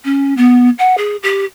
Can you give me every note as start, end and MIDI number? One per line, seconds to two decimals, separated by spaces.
0.05 0.34 61
0.37 0.70 59
0.79 0.95 78
0.98 1.16 68
1.23 1.45 67